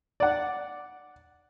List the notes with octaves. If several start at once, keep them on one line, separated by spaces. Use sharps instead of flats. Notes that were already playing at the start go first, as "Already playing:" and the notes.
D5 F#5